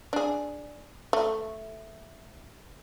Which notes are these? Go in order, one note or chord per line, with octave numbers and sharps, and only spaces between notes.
D4 G#4
A3